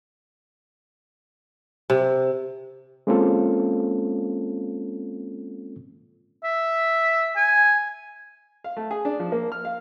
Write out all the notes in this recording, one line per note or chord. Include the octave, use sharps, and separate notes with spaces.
C3
G#3 A#3 C4 C#4 F4 A4
E5
G#5
F5
A3
G#4
D4
F3
A#3
F6
F5